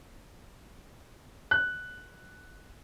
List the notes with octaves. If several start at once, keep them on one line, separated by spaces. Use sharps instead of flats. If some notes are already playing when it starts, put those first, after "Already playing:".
F#6